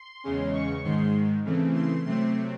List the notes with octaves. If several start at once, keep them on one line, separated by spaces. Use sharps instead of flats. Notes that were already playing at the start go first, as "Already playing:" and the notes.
Already playing: C6
E2 C#3 G#3 C#4
C#6
G#2 D#3 G#3 C6
C#3 E3 A3 C4
C6
C3 F#3 A3 C4 C6